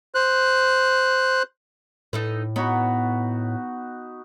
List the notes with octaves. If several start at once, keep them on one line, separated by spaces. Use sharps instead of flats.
C5 F#6
A2 D#4 A4 B4
B3 D#4 F#4 C#5 B5